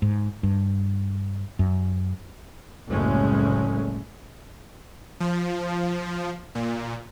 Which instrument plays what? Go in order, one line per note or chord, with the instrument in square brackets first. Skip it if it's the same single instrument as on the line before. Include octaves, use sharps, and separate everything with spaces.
[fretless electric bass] G#2
G2
F#2
[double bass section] F#1 C2 A2 G#3 A3 C#4
[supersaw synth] F3
A#2